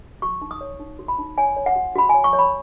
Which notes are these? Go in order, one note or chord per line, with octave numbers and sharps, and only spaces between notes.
F#4 C#6
D#4
D#6
C#5
D#4
F#4
B5
D#4
C#5 G#5
C#5
F#5
F#4
F#4 B5
G#5
C#5
C#6
C#5
B5